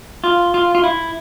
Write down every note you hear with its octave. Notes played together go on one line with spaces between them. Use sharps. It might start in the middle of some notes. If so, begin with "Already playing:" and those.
F4
F4
F4
E4